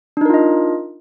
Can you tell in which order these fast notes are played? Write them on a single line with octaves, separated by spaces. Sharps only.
D4 D#4 A#4 F4 D#5